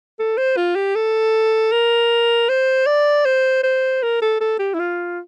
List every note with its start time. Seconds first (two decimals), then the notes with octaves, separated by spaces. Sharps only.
0.19 A4
0.37 C5
0.57 F4
0.76 G4
0.95 A4
1.72 A#4
2.49 C5
2.86 D5
3.25 C5
3.63 C5
4.03 A#4
4.22 A4
4.41 A4
4.59 G4
4.74 E4
4.79 F4